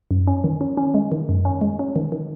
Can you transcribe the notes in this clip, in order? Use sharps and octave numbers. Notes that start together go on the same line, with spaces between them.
F#2
C#4
D#3
C#4
C#4
G#3
D#3
F#2
C#4
G#3
C#4
D#3
D#3